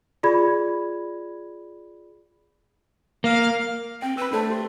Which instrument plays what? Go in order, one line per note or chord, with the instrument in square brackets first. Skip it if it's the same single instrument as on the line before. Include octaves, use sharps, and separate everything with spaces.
[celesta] F4 G#4 D5 B5 G#6
[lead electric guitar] A#3 [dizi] F5
[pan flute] C4 [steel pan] G5
[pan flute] B4 [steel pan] B5 E6
[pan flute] A3 [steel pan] D4 A4 C5
[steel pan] G4 C6